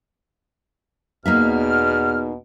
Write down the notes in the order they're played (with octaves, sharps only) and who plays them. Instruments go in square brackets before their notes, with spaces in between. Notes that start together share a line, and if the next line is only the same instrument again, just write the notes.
[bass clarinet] E2 [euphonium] B2 [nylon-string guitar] A#3 D#4 E5 [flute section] F6